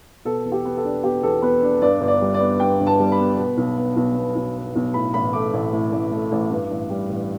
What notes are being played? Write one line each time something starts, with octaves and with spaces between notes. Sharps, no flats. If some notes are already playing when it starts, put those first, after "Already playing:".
B2 A4
E2
G4
B3
A4
D4
B2 G4
E2 A4
B3 B4
D4
G2 D5
G1
D5
G3
D5
B3
G2 G5
G1
A5
G3
B5
B3
B2
B1
B3
B1
B2
B1
B3
B1
A2 B5
A1 B5
A3 D6
A1
A2
A1
A3
A1
G2
A1
G3
A1